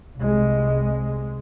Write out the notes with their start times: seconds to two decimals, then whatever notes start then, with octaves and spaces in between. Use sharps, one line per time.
0.16 C2 G#3